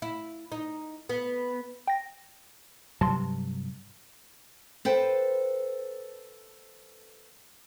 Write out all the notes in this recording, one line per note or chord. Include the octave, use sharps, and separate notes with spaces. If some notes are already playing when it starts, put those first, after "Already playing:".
E4
D#4
B3
G5 A#6
G2 C3 F#3 A5 C6
A4 B4 C5 G5